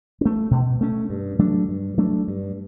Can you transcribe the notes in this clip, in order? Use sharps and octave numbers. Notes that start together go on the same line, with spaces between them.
A3 C#4
B2
A3 C#4
G2
F#3 A3 D4
G2
F#3 A3 D4
G2